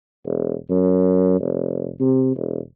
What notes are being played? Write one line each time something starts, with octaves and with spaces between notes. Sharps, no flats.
E1
F#2
F1
C3
E1